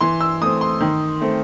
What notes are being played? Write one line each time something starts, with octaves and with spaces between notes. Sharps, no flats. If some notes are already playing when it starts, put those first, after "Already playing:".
E3 C6
E6
A3 C4 D#6
C6
D#3
A3 C4